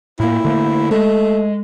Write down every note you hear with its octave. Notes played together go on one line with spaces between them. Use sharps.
A2 A#3 E4
D3 A3 A#3
G#3 A3